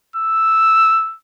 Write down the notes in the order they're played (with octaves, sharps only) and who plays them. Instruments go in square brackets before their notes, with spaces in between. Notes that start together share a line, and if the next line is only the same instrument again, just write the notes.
[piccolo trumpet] E6